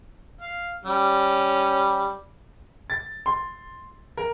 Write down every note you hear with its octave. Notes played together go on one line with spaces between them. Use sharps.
F5
G3 C#4
A6
C6
A#4